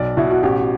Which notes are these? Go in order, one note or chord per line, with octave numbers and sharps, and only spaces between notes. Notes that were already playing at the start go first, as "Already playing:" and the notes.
Already playing: B1 D5
B2 E4
F#4
A1 G4